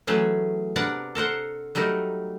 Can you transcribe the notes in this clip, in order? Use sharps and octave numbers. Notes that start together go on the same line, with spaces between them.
E3 F#3 A3 C#4 G#4
C3 B3 D4 A#4 D5 F#5
A4 A#4 C5 F#5
F#3 G3 A3 D#4 A#4